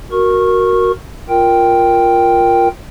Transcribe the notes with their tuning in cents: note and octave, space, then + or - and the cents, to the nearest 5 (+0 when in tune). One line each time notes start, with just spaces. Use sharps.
F#4 +0 A#4 +0 C#6 -20
F4 +0 A#4 +5 G5 +0